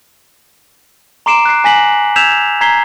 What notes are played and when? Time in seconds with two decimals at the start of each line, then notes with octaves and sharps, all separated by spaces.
1.26 A#5 C6 D6 C7 D7 E7
1.45 F#6 C7
1.64 G#5 A#6 B6 F#7
2.16 E6 G6 G#6 B6 E7 F7
2.61 A#5 G#6 B6 C7 G7